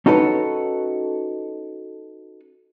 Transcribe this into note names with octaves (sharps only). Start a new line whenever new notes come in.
C#4 D#4 F#4 A4 B4 C#5